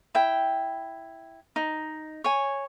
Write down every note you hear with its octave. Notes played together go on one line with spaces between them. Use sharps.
E4 G5
D#4
C#5 G#5